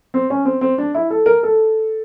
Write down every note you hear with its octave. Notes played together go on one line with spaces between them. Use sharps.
C4
C#4
C4
C4
D4
E4
A4
A#4
A4